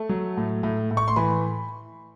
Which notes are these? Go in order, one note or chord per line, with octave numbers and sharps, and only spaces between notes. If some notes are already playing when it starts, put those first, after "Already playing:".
Already playing: A3
F#3
A2
A2
A2
C#6
C6
E3 B5